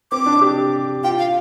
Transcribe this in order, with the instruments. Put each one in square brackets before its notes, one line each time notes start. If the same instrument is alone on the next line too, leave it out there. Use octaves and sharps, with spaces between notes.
[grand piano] C4 [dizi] D6
[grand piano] D4
G4
[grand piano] F4 [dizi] G5
[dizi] F5